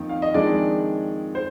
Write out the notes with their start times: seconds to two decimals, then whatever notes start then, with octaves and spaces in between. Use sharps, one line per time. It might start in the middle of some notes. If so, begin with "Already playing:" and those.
Already playing: F2 D#3 A#3
0.09 F5
0.22 D#5
0.34 F2 D#3 G#3 D4 D5
1.35 C5